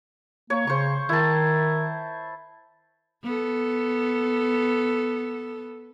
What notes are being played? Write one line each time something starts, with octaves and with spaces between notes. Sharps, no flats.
A#3 C#5
C#3 C5 C#6
D#3 E4 A5
B3 A4